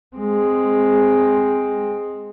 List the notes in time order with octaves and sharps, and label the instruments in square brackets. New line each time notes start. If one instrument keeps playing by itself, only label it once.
[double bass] G#3 C4